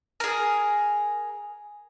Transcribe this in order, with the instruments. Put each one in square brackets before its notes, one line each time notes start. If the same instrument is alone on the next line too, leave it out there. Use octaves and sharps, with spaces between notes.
[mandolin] G#4 A#4